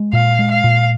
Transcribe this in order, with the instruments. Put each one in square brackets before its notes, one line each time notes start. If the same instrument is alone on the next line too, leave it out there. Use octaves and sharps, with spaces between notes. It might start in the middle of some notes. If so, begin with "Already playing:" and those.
Already playing: [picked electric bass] G#3
[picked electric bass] A#2 [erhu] F5
[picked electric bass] G#3
[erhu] F5
[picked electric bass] A#2